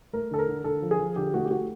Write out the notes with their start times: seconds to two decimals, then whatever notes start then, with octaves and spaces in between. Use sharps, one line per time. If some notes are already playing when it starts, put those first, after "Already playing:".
0.13 A3 A#4
0.31 D3 A4
0.39 A#4
0.48 D3
0.64 D3 A4
0.82 F3
0.91 G#4
0.99 F3
1.16 D3 G4
1.34 A3 F#4
1.45 G4
1.50 A3 F#4